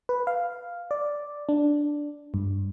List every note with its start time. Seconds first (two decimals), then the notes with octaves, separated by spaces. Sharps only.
0.09 B4
0.27 F5
0.91 D5
1.49 D4
2.34 G2